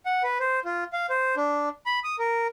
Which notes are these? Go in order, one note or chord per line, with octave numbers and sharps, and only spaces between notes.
F#5
B4
C5
F4
F5
C5
D4
B5
D#6
A#4